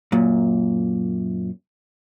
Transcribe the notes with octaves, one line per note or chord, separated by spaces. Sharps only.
F#2 A#2